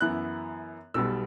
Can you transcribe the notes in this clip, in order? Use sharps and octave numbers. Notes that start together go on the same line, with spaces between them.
F#2 E3 B3 E4 F#6
B1 B2 G3 E6